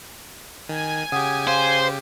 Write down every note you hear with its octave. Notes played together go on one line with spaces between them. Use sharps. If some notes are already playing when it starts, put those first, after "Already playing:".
D#3 G#5
C#3 G4 F#5 D#6
C5 F5